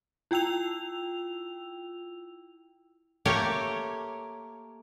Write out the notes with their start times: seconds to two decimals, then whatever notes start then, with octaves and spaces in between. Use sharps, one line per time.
0.31 E4 F4 G5 E6 F7
3.25 A3 A#3 G4 A#4 C#5